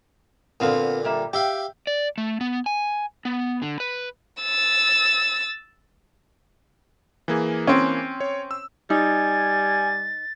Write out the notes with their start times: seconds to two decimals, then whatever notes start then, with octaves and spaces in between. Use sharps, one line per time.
0.60 A#2 D3 B3 C4 F5
1.05 G3 A#3 E5
1.33 G4 E5 F5 G5
1.87 D5
2.18 A3
2.41 B3
2.66 G#5
3.25 B3
3.62 D3
3.80 B4
4.42 E6 A6
7.28 E3 A#3 G#4
7.67 C4 C#4
8.20 C#5
8.51 E6
8.90 G3 D#4 G#5 A6